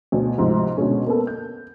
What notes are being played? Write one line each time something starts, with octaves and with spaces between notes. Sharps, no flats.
D2 B2
D2 G#2 C3 F3
B2 D3 G#3 C#4
A#3 B3 A4
G6